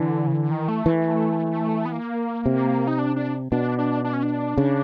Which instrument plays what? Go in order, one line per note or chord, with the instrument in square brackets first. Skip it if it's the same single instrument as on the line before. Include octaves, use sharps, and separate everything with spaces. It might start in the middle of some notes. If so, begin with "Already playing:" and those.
Already playing: [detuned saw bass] D3 [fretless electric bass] E3
[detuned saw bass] C#3
D3
D#3
A3
[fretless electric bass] E3
[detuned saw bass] B3
A#3
[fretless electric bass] C3
[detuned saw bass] D#4
D4
D4
[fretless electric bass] B2 [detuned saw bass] D4
[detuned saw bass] D4
D4
C#4
D4
[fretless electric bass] C#3